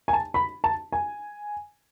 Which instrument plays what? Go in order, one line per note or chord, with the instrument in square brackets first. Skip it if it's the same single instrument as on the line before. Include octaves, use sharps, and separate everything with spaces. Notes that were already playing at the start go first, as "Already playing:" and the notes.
[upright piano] G#5
A5
B5
A5
G#5